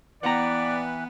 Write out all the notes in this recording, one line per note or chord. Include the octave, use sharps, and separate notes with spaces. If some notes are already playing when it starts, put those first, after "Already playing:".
E3 B3 B4 D5 F#5 G5 A#5